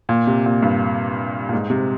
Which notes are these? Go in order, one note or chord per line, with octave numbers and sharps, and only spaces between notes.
A#2
C3
A#2
G2
A#2
G#2
C3